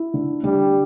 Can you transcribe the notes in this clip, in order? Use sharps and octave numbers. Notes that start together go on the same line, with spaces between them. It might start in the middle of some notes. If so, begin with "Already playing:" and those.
Already playing: E4
D3
D3 G3